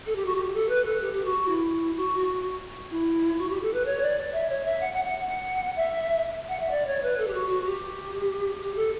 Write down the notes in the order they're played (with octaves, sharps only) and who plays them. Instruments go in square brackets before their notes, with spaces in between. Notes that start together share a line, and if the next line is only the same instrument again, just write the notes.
[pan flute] A4
G4
F#4
G4
A4
B4
A4
G4
G4
F#4
E4
F#4
F#4
E4
F#4
G4
A4
B4
C#5
D5
E5
C#5
E5
F#5
F#5
F#5
F#5
E5
F#5
E5
D5
C#5
B4
A4
G4
F#4
F#4
G4
G4
A4